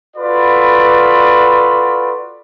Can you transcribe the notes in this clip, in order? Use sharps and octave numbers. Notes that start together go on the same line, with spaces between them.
F4 F#4 A4 B4 D5 B5